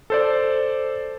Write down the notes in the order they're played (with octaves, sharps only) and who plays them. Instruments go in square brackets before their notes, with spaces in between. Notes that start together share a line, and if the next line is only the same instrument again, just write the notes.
[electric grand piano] A4 C5 D5